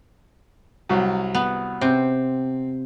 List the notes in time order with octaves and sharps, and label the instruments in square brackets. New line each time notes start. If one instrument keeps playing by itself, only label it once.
[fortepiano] C2 F#3
[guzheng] B3
[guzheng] C3 [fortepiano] C4